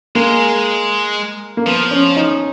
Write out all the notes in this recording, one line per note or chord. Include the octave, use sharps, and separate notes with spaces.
G#3 A#3
A#3
F3 B3
C#4
D#4